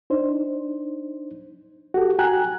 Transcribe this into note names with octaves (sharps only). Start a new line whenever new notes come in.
D4 D#4 C5
F#4 G4 A4
F#4 G5 G#5 A#5 F#6